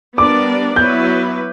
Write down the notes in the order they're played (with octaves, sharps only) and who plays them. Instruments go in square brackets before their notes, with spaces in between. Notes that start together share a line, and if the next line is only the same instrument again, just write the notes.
[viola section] G3 B3 D4 A#4 D5 [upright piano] D6
[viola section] F#3 B3 E4 B4 [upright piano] G6